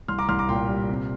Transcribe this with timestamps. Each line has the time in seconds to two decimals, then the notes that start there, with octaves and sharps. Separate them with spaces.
0.08 C2 C6 F6
0.19 A#5 D6
0.29 C2 C6 F6
0.39 A#5 D6
0.49 A#2 G5 C6
0.69 G3
0.89 C3